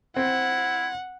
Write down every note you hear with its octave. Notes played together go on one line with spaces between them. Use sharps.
C4 E4 F#5